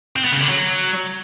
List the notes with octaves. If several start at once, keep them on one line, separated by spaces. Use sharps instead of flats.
C4
B3
C#3
D3
F#3